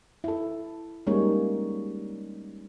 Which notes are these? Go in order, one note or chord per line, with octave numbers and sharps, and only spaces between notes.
E4 A4
G3 G#3 A#3 C#4 D#4 C#5